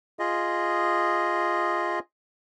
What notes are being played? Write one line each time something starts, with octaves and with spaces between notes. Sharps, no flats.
F4 G#4 D#5